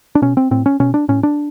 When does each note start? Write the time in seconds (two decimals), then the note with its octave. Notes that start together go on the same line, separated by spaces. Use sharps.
0.15 D4
0.22 B2 C#4
0.37 C4
0.51 A2 C4
0.66 C#4
0.80 B2 C#4
0.94 D4
1.08 A2 C#4
1.23 D4